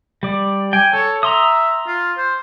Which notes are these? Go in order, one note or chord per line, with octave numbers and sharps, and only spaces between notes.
G3 D5
G5 G#5
A4 C#5
E5 A#5 C6 D#6
F4
C5